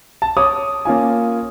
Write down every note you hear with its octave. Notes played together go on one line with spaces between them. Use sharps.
A5
C#5 D6 D#6
A#3 C#4 F4 G#5